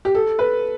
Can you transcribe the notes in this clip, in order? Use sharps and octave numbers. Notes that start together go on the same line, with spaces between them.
G4
A4
B4